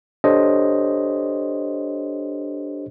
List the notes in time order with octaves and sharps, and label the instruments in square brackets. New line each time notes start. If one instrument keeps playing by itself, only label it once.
[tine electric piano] D4 G4 A4 C5 C#5 D#5